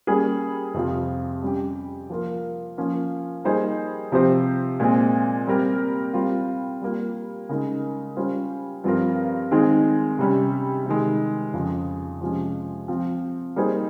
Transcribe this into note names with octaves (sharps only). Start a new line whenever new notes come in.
G3 A#3 C#4 G#4
F2 C3 F3 C4 F4
G3 C#4 G4
F3 A#3 F4 A#4
F3 A#3 C#4 F4
G3 A#3 D#4 G#4 C5
C3 F3 C4 G4 C5
A#2 G#3 C4
G3 C4 G4 A#4
G3 C4 F4
G3 A#3 F4
C#3 G#3 D#4 A#4
G3 C#4 F4 C5
G2 F3 C4 F4 A#4
D#3 G#3 C4 D#4 G#4
C3 G3 C#4
C3 D#3 G#3
F2 C#3 F3
C3 F3 G#3 C#4
F3 C4 F4
G3 A#3 D#4 G#4 C5